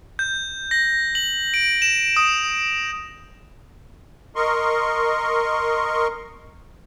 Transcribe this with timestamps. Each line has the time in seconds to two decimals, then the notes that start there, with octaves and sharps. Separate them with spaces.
0.19 G6
0.71 A#6
1.15 F#7
1.54 D7
1.82 E7
2.17 D#6
4.36 A#4 D#5 C6 C#6